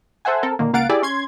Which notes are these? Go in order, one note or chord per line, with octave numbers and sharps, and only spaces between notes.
A4 C5 E5 F#5 G#5
C4 A4 A#4
A#2 D3 D#3 A#3
C#2 A#3 F5 F#5 A6 D7
E4 G4 G#4 D5
C#4 C6 G#6